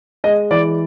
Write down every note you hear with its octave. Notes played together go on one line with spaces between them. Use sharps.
G#3 D#5
E3 D5